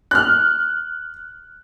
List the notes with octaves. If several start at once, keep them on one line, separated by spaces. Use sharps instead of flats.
F6 F#6